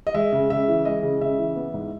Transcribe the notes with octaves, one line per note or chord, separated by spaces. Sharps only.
D#5
G#3 E5
C#3
C#3 E5
E3
G#3 D#5
C#3
C#3 E5
E3
B3
G#2